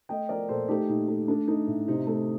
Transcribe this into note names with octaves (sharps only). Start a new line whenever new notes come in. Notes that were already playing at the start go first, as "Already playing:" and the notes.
A3 D#5 G5
F3 A#4 D5
A#2 A4 C5
A3 D#4 G4
A#2 D#4
A3
A3 D4
A3 D#4
A2
C3 D#4
A3